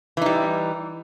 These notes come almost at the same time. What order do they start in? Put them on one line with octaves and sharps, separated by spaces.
E3 D#4 G3